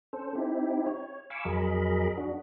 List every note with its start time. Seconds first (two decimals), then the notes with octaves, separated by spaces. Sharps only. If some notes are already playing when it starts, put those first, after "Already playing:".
0.13 C#4 A4 C5
0.35 C4 D#4 E4 G4
0.86 C#5
1.30 F5 G#5 B5 C#6 D6 E6
1.45 F2 F#3 G#4 A#4 D#5 B5
2.17 D4 F#4